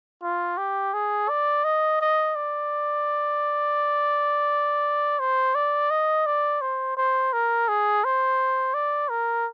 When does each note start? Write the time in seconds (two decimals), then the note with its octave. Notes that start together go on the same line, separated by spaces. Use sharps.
0.23 F4
0.58 G4
0.94 G#4
1.29 D5
1.64 D#5
2.01 D#5
2.36 D5
5.19 C5
5.55 D5
5.90 D#5
6.26 D5
6.61 C5
6.97 C5
7.33 A#4
7.68 G#4
8.04 C5
8.74 D5
9.10 A#4